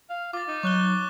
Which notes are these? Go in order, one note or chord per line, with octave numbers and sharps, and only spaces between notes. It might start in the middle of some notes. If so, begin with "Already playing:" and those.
F5
F4 D6 A6
D#4
F#3 C#6 F#6 G7